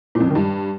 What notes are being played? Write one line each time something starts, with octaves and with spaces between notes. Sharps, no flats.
A#2
F2
F#2
D#3
G2